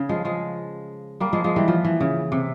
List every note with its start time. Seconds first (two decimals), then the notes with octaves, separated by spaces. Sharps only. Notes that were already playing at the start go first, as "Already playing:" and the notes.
Already playing: C#3
0.09 F3 G#3
0.25 F3 G#3
1.20 G3 A#3
1.33 F3 G#3
1.44 F3 G#3
1.56 E3 G3
1.68 F3
1.84 E3
2.00 C#3
2.32 C3